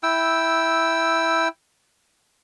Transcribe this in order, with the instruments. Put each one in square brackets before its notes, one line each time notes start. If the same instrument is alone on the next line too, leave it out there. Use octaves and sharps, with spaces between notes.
[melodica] E4 G5 E6